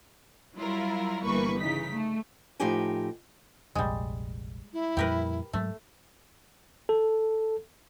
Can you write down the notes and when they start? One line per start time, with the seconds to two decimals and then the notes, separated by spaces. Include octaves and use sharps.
0.56 F#3 G3 E4 F4 A#4
1.23 G1 E3 G3 A#3 B4 C#6
1.59 C#3 E3 D#4 B6
1.92 A3
2.60 A2 F3 D#4 G4 G5 G#5
3.75 F1 A#1 G3 G#3
4.73 E4
4.97 F2 A#2 G3 G4 A#4 B4
5.53 G#2 F#3 G#3 A3
6.89 A4